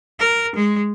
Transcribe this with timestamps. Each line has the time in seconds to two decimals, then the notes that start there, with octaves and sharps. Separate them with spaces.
0.20 A#4
0.55 G#3